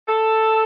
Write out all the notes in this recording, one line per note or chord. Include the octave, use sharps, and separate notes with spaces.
A4